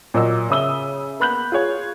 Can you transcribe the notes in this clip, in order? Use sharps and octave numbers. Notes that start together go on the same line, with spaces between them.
A#2 F#3 A#3 D#5 E6
C#3 E5 D#6 E6 G7
A#3 B3 B5 F#6 G6 F#7
F4 G#4 C#5